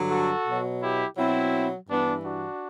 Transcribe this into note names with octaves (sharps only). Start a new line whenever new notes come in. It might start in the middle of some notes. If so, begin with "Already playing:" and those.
Already playing: G2 D3 F#3
F#4 A4
B2 F#3
E4 G4
B2 F#3 C4 E4
G2 E3 B3 D4
D4 F#4